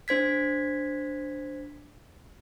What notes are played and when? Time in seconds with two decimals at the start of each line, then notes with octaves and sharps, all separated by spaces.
0.08 D4 C5 G#6 B6